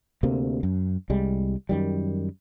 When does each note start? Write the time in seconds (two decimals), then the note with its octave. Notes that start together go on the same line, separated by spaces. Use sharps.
0.23 D2 C3 A#3
0.63 F#2
1.10 C2 G3 G#3
1.69 F#2 D#3 G3